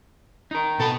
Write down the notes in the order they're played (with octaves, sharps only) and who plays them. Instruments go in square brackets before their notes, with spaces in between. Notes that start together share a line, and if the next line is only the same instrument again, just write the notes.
[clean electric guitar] D#4 A#4
[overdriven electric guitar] B2 B5 [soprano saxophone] A4